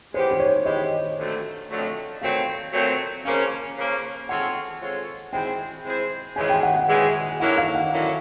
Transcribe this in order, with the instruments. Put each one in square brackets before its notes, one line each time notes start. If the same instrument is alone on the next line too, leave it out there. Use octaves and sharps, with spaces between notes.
[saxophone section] G#3 B3 E4 G4 [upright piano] C5
[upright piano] C5
C#5
[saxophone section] G#3 B3 E4 G4 [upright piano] D#5
[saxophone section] F2 D3 F#3 A3
F2 D3 F#3 A3
[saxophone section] A#2 F#3 A3 C4 [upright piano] F5
[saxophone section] A#2 F#3 A3 C4
[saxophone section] C#3 F3 A#3 C#4 [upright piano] F5
[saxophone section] C#3 F3 A#3 C#4
[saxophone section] G#3 C4 F4 A4 C#5 [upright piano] F#5
[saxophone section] G#3 C4 F4 A4 C#5
[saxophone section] G#3 C4 E4 G#4 C5 [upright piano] G5
[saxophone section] G#3 C4 E4 G#4 C5
[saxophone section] C#3 E3 G#3 [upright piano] G#5
[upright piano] G5
F#5
F#5
[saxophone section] C#3 E3 G#3
[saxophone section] D3 F#3 A#3 C#4 E4 [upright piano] F#5
[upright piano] F5
F#5
[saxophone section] D3 F#3 A#3 C#4 E4